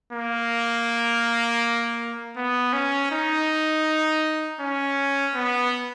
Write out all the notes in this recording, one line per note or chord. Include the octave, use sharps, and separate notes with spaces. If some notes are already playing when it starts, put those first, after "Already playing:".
A#3
B3
C#4
D#4
C#4
B3